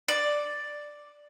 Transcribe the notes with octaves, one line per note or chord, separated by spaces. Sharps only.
D5